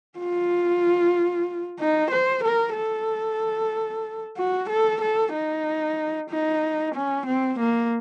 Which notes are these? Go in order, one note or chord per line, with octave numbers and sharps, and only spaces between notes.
F4
D#4
C5
A#4
A4
F#4
A4
A4
D#4
D#4
C#4
C4
A#3